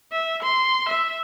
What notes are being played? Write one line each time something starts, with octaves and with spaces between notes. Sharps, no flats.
E5
C6
E5